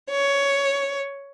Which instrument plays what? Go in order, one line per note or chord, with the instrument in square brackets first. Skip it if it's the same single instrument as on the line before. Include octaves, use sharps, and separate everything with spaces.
[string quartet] C#5